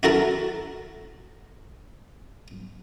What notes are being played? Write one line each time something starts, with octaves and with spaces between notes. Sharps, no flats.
E4 F#4 A4 A#4 A5